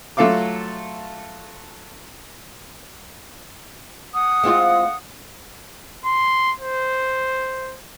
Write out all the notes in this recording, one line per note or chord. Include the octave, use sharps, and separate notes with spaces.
F#3 A3 F4 A4 F5 D6
F#5 D#6
G#3 C4 F4
C6
C5